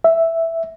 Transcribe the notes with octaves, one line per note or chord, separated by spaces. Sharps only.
E5